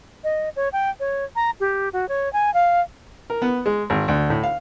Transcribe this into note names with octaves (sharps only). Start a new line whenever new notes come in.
D#5
C#5
G5
C#5
A#5
G4
F#4
C#5
G#5
F5
A#4
B3
G#3
G#1
D2
A2
F5